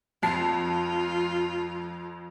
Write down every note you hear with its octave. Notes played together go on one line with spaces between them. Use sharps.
F2 F4 A5 C7